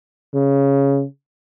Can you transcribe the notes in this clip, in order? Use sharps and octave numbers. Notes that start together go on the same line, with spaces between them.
C#3